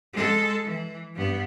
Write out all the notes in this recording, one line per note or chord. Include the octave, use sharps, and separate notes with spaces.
G#3 A4
E3
G2 B3